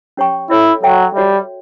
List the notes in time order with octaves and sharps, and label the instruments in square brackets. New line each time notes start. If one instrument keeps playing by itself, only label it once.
[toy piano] C#4 G4 C#5 G5 C#6
[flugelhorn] E4 [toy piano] A4 C#5 E5
[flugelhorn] F#3 [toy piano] A4 C#5 E5 G5
[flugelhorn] G3 [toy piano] F#4 C#5 E5